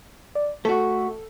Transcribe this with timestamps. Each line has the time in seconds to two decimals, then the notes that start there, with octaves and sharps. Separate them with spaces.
0.35 D5
0.65 A3 F#4 A4